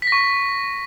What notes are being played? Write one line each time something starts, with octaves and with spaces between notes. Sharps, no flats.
B6
A#6
C#6